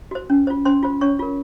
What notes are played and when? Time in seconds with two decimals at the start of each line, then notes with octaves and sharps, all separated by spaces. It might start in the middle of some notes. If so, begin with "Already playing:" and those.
0.11 F#4 C5
0.30 C#4
0.47 F4 C5
0.65 C#4 C5 C6
0.83 F4 C5
1.01 C#4 C#5 C#6
1.19 F4 A#4